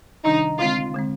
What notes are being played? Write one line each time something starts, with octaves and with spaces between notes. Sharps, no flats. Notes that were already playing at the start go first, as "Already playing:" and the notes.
C3 D#3 G3 D4 D#4
D3 G#3 C4 F4
D3 G#3 C4